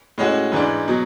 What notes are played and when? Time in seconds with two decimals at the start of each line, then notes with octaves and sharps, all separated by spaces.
0.18 A2 G#3 C#4 F#4
0.52 G#2 E3 G#3 D4
0.88 B2 F#3